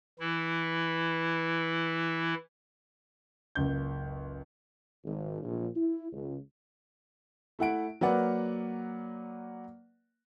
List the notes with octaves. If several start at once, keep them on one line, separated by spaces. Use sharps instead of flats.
E3 E4
F#1 C#2 G6
G#1
A#1
E4
C#2
A3 E4 F#5 D7
F#3 A#3 A#4 B4 D5 F#5